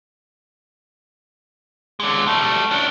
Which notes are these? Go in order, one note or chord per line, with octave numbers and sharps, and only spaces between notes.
G#3 D4
G3 A3
C#4 D4